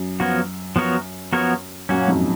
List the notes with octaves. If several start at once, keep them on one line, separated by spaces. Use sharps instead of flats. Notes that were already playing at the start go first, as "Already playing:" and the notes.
Already playing: F#2
F3 B3 F#4 A#4 C#5
F3 B3 F#4 A#4 C#5
F3 B3 F#4 A#4 C#5
F#2 A#2 A#3 C#4 F#4
F2 G#2